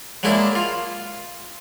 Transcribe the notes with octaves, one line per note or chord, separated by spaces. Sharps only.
F#3 G#3 A#3 D4 E4
F4